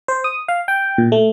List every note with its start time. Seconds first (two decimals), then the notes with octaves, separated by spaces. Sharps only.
0.08 C5
0.24 D#6
0.48 F5
0.68 G5
0.98 A#2
1.12 A3